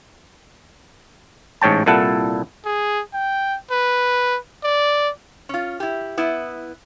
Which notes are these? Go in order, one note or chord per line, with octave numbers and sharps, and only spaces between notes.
A1 G#2 C#5 G5 A5
C2 A#2 E4 A4 F#5 A5
G#4
G5
B4
D5
C#4 F4
E4 G4
B3 E4